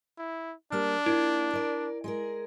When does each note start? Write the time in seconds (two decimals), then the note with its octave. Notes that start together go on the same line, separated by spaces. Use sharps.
0.18 E4
0.72 G3 A#3 D4 G4 F6
1.06 A#3 E4 F4
1.53 A#4 D5
2.04 G#3 G#4 A#4